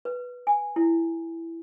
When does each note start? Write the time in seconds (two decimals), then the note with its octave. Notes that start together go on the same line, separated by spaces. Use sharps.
0.05 B4
0.47 G#5
0.76 E4